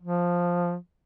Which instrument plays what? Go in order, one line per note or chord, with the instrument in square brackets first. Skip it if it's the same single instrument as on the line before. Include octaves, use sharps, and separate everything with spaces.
[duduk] F3